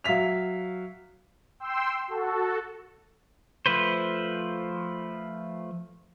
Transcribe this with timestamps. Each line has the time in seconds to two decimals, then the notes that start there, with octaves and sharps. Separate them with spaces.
0.04 F#3 E5 F5 B6 F7
1.60 G5 C6 E6
2.08 F#4 A4
3.66 F3 A3 B4 C5